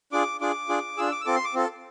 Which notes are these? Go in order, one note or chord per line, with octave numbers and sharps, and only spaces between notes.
D4 F4 G#4 D6
D4 F4 G#4 D6
D4 F4 G#4
D4 F4 G#4 E6
D6
E6
C4 F4 A4 D6
C6
D6
C4 F4 A4